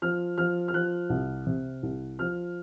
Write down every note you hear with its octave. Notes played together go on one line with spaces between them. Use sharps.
F3 F6
F3 F6
F6
F3 F#6
C2
C3
C2
F3 F6